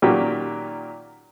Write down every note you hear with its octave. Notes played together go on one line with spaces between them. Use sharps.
A#2 D#3 F#3 C#4 G4